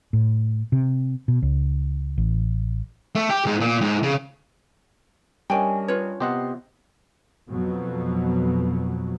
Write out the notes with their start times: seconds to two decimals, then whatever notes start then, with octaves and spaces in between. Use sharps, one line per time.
0.13 A2
0.72 C3
1.28 B2
1.42 C#2
2.18 A1
3.15 A3
3.30 G4
3.46 G#2
3.61 A#2
3.81 G#2
4.03 C#3
5.50 G3 C#4 D4 A#4 D#5 G5 G#5
5.88 F4 B4 C#5
6.20 C3 B3 G4 D#5 F#5 C6
7.49 F2 B2 F#3